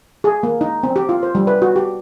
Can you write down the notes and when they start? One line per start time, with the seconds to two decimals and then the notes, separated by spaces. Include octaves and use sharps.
0.24 G#4
0.43 A#3
0.61 D#4
0.83 C4
0.96 G4
1.09 F4
1.23 C5
1.35 G3
1.47 B4
1.62 F#4
1.76 G4